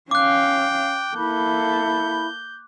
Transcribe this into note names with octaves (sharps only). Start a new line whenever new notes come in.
C#4 F5 G5 D6 F#6
A#3 E4 A4 B5 G6